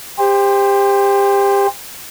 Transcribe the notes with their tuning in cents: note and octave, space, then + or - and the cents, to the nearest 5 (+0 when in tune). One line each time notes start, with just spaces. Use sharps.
G4 +25 C5 +0